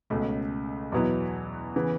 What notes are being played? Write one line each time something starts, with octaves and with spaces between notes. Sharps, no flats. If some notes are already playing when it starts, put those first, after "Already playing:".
C#2 B2 A3 C#4
E2 B2 F#3 B3 E4
C#3 E3 B3